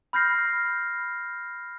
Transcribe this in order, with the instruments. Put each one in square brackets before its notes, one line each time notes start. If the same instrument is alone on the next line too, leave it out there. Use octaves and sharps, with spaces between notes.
[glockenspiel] B5 F6 G6 A#6 C7